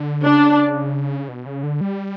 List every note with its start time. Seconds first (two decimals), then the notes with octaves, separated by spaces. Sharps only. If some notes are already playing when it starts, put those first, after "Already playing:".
Already playing: D3
0.24 C#3 D4
1.28 B2
1.46 C#3
1.63 D3
1.81 G3